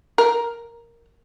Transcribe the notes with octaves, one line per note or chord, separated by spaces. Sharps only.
A#4